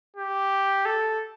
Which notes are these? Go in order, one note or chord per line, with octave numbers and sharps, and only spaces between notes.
G4
A4